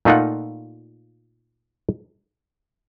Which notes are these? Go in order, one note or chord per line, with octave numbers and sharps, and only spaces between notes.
A#2 A3 D#4 F4 F#5